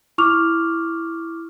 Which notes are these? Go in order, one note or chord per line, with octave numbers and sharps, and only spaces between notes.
E4 C#6 D6 F6 F7